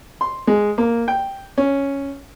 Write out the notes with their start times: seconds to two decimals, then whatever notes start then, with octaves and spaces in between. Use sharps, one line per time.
0.21 C6
0.47 G#3
0.78 A#3
1.08 G5
1.58 C#4